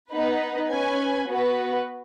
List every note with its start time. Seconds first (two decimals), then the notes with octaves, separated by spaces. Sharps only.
0.12 B3 D#4 B4
0.70 C#4 B4 G#5
1.28 B3 F#4 B4